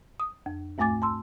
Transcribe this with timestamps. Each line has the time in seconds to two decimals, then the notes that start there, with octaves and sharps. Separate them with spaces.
0.20 D#6
0.46 F2
0.78 D#2 G#2 A3 G#5 D6 A6
1.02 A5 C6 E6